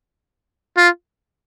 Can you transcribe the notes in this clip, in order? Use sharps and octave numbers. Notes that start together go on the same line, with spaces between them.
F4